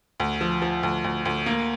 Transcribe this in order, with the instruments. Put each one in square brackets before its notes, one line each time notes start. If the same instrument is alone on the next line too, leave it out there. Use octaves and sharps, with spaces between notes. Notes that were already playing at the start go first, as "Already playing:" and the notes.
[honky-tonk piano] D2
F3
F3
D2
D2
D2
A#3